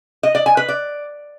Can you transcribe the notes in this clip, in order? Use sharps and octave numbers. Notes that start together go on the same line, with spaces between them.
D#5
D5
G#5
B4
D5